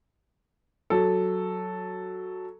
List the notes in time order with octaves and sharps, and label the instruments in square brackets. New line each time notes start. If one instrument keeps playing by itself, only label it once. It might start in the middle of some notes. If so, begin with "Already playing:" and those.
[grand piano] F#3 A4